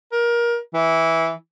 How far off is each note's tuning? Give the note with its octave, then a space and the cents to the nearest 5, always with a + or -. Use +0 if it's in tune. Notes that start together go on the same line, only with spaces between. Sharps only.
A#4 +25
E3 -10